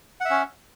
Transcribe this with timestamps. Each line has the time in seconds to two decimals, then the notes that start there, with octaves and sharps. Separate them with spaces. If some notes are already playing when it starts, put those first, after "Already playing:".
0.21 F#5
0.25 E5
0.30 C#4